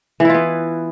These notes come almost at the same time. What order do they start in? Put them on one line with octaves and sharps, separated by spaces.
E3 E4 F4 B3